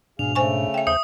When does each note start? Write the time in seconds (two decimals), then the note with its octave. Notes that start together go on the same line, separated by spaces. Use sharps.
0.19 D2 G#2 B2 D4 G#4 F5 F7
0.35 C#3 A3 C5 G#5 C#6
0.74 E5 G5
0.87 D#2 C5 E5 D#6 G6